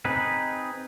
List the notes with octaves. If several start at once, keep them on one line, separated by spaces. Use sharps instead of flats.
C4 D#4 G#4 B4